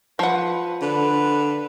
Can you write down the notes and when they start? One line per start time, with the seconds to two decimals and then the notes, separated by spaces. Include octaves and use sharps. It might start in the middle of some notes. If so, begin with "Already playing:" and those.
0.19 F3 B4 F#5
0.82 D3 B4